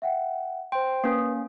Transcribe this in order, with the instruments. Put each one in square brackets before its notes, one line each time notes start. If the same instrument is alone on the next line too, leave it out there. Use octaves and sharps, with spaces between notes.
[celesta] E5 F#5 G5
[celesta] C5 C6 [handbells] G5
[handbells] A#3 C#4 [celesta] B4 D#6